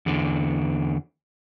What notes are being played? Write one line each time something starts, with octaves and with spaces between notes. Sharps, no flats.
E2 D3